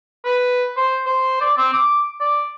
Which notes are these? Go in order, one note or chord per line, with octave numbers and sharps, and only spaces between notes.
B4
C5
C5
D5
C4
D6
D5